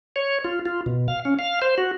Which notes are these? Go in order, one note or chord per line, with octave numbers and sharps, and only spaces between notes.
C#5
F4
F4
B2
F5
C#4
F5
C5
F#4